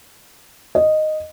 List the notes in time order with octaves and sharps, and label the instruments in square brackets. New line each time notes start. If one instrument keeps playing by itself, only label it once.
[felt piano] D#5